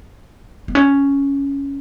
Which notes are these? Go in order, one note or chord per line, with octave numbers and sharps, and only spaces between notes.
B3
C#4